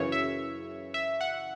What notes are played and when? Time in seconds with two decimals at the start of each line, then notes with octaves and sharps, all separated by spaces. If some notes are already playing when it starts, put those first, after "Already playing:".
Already playing: F#2 C#3 E3 C#5
0.12 E5
0.94 E5
1.21 F#5